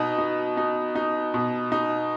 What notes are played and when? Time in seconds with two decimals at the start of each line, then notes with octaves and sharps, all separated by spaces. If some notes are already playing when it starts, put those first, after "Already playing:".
Already playing: B2 D#4
0.18 D#4
0.57 D#4
0.95 D#4
1.34 B2
1.72 D#4